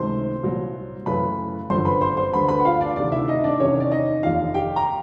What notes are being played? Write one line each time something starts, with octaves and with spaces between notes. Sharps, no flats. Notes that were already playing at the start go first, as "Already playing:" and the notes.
Already playing: C#2 C3 D#3 F#3 A3 C5 C6
C2 A#2 F#3
F#2 C#3 E3 A3 B4 B5
G1 F#2 D3 F3 C5 C6
B4 B5
C5 C6
C5 C6
D2 D3 G3 B4 B5
B4 B5
F#5
F4 F5
D4 D5
D2 C3 D#3 D4 D5
E4 E5
D#4 D#5
D4 D5
E2 C3 D#3 C#4 C#5
D5
D#4 D#5
F1 D#2 D#3 F4 F5
G4 G5
A#5